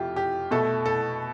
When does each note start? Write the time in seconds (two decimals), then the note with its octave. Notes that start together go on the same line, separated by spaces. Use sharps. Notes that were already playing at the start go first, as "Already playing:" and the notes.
Already playing: F2 F3 A3 E4 F4 G4
0.16 G4
0.51 B2 A3 A4
0.86 A4